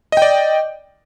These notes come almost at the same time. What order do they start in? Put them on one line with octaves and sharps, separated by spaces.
D#5 G5 D5